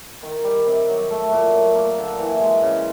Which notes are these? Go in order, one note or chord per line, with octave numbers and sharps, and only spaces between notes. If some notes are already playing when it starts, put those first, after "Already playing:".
D#3
G3
C3
F#3
A3
A#2
F#3
A#3
D3
E3
G#3
C#3